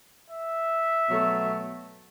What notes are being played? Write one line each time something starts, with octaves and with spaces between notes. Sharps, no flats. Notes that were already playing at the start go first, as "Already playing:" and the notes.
E5
B2 F#3 A3